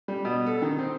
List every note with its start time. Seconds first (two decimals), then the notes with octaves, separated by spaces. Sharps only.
0.08 G3
0.25 B2
0.46 A4
0.62 D#3
0.78 C4